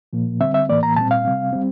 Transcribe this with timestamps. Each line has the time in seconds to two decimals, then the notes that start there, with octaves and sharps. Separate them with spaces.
0.13 A#2 F3 A#3
0.40 D3 G3 C4 E5
0.54 E5
0.69 A2 E3 A#3 D5
0.83 A#5
0.96 A#2 G3 C4 A5
1.11 F5
1.25 C3 G3 C4
1.53 G3 C4